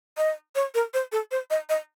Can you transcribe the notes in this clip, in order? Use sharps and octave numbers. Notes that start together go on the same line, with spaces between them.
D#5
C#5
A#4
C5
A4
C5
D#5
D#5